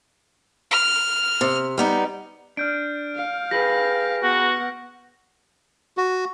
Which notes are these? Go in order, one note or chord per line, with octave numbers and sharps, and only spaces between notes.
F6
C3
G3 B3 D#4
D4 F6 G6 D7
F5
G4 G#4 B4 A#6
B3 F#4 F#5
F#4